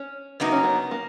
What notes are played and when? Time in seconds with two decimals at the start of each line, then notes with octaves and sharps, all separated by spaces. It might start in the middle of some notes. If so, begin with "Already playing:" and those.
Already playing: C#4
0.40 F#2 C#3 F#3 A#3 B3 D#4
0.52 C#4
0.64 B3
0.91 A#3